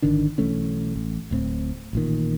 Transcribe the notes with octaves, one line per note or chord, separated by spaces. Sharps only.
G#1 D3 D#3 D4
B1 E3 A3 C#4
A1
D1 A2 C4
A1 A#2 D#3